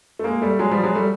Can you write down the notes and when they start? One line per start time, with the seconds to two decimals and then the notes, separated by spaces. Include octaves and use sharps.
0.19 A3
0.24 G#3 A#3
0.42 G3 A3
0.59 F#3 G#3
0.71 F3 G3
0.83 F#3 G#3
0.95 G3 A3